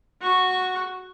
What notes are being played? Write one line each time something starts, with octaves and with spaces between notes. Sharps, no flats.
F#4 C#6